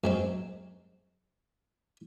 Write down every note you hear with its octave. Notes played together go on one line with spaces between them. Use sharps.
F#2 G#3 C4